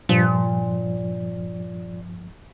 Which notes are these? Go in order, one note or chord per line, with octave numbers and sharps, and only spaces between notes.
G2 A#2 F3